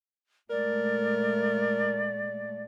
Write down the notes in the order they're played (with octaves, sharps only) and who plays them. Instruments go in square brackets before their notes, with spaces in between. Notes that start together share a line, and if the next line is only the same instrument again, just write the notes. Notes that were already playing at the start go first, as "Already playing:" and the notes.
[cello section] A#2 G#3 A3 [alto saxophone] A#4 [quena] D5